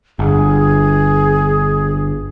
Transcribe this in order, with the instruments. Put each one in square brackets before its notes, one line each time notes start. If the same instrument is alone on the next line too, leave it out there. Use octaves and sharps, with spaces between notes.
[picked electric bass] G1 [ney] G#4